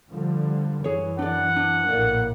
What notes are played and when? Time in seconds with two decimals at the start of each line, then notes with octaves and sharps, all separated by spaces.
0.10 D3 F3 G3
0.84 F#2 E3 G#4 C#5
1.19 D4 D5 F#5
1.56 D4
1.89 A#1 A2 A#3 A#4 D5